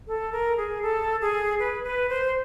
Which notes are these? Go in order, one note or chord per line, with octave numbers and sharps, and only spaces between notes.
A4
A#4
G#4
A4
G#4
B4
B4
C5